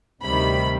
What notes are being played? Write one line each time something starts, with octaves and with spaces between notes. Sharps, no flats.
D2 C3 D#3 G3 B5